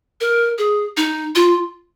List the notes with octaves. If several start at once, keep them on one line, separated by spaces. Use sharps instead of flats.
A#4
G#4
D#4
F4